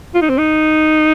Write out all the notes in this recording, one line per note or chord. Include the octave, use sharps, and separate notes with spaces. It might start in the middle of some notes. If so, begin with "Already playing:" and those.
F4
D#4
C4
D#4